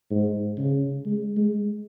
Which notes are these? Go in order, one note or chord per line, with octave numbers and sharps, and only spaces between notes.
G#2
C#3
G#3
G#3